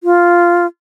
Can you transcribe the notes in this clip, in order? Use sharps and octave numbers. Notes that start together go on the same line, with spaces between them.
F4